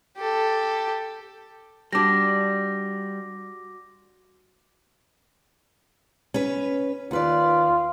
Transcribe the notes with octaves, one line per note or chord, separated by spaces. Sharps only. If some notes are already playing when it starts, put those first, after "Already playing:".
G4 A4
G3 D4 F#4 D6 A#6
C#4 B4
D#2 F4 B4 D5